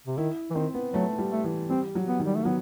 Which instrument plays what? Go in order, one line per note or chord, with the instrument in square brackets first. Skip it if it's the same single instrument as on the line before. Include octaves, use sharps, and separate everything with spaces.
[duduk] C3
[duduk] D#3 [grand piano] E4
[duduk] E3
[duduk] D#3 [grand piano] C4
[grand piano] B3
[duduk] F#3 [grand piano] A3
[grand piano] G3
[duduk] A3
[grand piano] E3
[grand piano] G3 [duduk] C4
[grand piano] F#3
[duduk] B3
[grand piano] D#3
[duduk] G3
A3
[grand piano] F#3 [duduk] B3